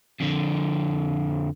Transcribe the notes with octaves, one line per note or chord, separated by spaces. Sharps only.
F2 D3